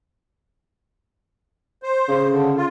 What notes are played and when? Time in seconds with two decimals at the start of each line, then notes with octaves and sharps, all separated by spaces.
1.83 C5
2.08 C#3
2.30 D3
2.56 F4